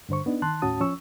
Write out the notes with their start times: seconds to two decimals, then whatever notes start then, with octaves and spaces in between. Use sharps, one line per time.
0.09 G2 D3 C5 C#6
0.26 B3 D4 D#4
0.42 D#3 A5 C6 F#6
0.62 D#2 A2 C#4 F#4 A5 D#6
0.81 F3 C#4 C#6 E6